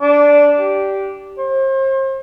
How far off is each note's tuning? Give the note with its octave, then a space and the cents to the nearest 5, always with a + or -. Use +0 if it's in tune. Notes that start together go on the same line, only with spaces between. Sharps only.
D4 -10
G4 -10
C5 +40